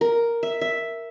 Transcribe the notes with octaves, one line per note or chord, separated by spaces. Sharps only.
A#4
E5
E5